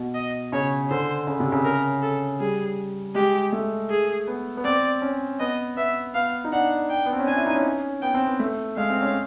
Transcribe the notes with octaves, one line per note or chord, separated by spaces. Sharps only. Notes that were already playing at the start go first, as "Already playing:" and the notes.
Already playing: B2
D#5
C#3 C#5
D3 C5
C#3
C3
C#3
A#4
A4
G3 G#4
G#3 G4
A3
G#4
B3
B3
C4 D5
C#4
B3 D#5
B3 E5
B3 F5
D#4
D4 F#5
G5
B3
C4
C#4
D4 G#5
E4
D#4
C#4
B3 G5
C4
B3
A3
G#3 F5
C4
C#4